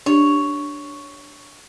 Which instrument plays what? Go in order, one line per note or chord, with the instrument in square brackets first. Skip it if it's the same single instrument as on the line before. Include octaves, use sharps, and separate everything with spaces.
[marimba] D4 G4 [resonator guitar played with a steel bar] C#5